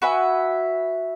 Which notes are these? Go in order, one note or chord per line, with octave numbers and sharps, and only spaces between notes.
F#4 B4 E5 G#5